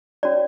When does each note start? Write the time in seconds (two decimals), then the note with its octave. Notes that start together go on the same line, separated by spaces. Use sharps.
0.23 C#4 F#4 A4 C#5 D5